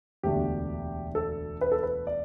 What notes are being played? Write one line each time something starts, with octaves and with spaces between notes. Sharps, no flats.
E1 D2 D3 A3 D4 G4
A4
B4
A4
B4
D5